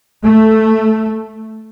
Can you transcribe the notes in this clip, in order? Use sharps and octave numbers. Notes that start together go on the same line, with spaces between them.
A3